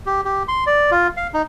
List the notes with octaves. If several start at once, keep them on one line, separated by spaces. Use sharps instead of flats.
G4
G4
C6
D5
F4
F5
D#4